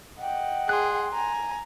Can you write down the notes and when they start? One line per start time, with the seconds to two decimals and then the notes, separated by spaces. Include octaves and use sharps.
0.20 D#5 F#5 G5
0.69 G#4 C6 F#6
1.13 G#5 A#5